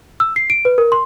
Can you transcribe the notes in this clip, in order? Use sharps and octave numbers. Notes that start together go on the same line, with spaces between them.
E6
C7
D7
B4
A#4
C6